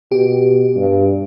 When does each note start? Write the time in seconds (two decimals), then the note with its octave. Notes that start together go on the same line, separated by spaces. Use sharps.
0.12 B2 G4
0.76 G2